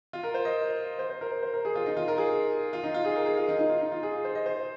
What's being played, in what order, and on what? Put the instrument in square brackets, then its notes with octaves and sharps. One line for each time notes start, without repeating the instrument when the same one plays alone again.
[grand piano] F4
A#4
C5
D#5
C5
C5
A#4
C5
C5
A#4
G#4
F4
D#4
F4
A#4
G#4
F4
D#4
F4
G#4
A#4
G#4
F4
D#4
D#4
F4
D#4
F4
G#4
C5
D#5
C5